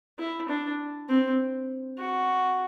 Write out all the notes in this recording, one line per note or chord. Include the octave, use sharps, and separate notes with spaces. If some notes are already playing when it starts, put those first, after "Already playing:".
E4
D4
C4
F#4